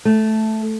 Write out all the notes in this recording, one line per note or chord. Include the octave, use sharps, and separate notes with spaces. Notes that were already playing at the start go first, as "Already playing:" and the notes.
A3